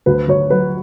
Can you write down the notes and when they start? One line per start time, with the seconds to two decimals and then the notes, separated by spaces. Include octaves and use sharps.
0.06 D2 B4
0.28 D2 C#5
0.50 F#3 B4